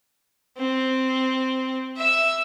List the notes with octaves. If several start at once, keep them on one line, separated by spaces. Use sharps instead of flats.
C4
E5 E6